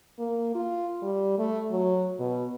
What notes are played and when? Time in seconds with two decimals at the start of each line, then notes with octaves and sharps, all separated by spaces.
0.19 A#3
0.55 F4
1.02 G3
1.38 A3
1.71 F#3
2.19 B2